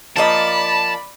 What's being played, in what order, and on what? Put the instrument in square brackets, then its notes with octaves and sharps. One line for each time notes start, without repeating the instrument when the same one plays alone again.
[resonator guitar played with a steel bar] F3 A#3 D#5 [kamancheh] D5 B5 [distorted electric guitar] A5